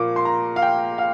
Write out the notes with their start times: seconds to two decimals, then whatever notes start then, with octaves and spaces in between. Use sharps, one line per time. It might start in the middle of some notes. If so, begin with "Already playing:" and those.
Already playing: A#2 F3 A#3 D6
0.16 C6
0.25 A#5
0.56 F5
0.62 G5
0.98 F5